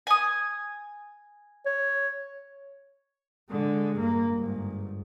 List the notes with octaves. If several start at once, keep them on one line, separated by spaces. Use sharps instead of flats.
G#5 D#6
C#5
D3 G#3
G2 A#3
G1 G#2